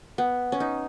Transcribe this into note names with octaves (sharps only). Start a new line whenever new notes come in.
B3
C#4
D#4